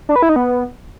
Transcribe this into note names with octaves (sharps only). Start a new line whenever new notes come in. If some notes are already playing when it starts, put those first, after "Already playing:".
D4
B4
E4
D#4
B3